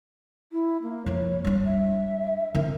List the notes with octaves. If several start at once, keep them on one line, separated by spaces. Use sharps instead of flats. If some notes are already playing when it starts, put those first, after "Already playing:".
E4
A#3
F2 F3 C#5
G3 D4
E5
D3 C4 A#4